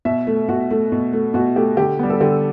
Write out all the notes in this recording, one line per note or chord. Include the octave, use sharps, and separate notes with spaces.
B2 E5
A3
B2 F#4
A3
B2
A3
B2 F#4
A3 G4
D3 G4
G3 B3
A4
D3 G4